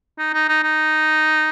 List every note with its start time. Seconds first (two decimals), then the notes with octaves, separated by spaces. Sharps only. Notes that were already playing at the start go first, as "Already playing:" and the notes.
0.18 D#4
0.33 D#4
0.48 D#4
0.63 D#4